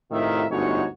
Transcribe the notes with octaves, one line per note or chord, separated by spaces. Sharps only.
A2 C3 D#3 F4 A#4 E5
G1 D2 G#2 D#4 F#4 C#5